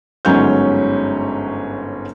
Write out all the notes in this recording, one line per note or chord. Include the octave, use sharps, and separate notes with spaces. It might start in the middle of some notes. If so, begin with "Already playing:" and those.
G1 G#2 F#3 C#4 C#5 G6